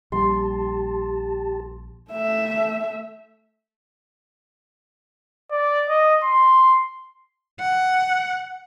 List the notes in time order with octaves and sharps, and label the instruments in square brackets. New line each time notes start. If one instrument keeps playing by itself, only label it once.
[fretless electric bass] A#1 G3 [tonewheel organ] G4 A5 [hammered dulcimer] C6
[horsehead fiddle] A3 E5
[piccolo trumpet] D5
D#5
C6
[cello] F#5